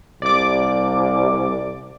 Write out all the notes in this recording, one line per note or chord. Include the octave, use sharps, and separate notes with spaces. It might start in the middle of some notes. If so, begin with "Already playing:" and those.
C2 D5 D6